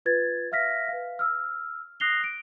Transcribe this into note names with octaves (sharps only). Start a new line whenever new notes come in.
F4 B4 G#6 A6
E5 F5 F6 A#6 B6
B4 F5
E6 F6
D#6 F#6 A#6 C7 F7 G7
D7